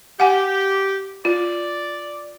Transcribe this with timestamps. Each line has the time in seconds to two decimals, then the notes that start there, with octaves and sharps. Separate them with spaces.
0.20 G4 F#5 G#5
1.25 F4 D5